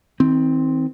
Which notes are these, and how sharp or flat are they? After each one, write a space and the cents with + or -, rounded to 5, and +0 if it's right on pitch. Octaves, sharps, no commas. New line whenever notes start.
D#3 +45 C4 +0